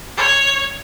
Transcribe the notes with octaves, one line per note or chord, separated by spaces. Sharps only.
C#5